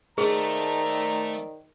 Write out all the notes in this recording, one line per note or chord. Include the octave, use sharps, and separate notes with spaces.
D#3 A3 G#4 C5 D5 A#5